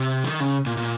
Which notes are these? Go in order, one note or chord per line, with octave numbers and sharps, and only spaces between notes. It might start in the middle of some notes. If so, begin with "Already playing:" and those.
Already playing: C3
D#3
C#3
A#2
A#2